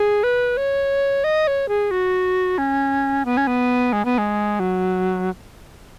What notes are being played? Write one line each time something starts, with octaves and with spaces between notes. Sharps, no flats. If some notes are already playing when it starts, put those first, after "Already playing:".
Already playing: G#4
B4
C#5
D#5
C#5
G#4
F#4
C#4
B3
C#4
B3
G#3
B3
G#3
F#3